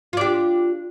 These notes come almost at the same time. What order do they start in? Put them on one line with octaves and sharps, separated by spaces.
F4 D4 G4